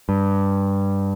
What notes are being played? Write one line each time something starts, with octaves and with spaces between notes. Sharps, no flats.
G2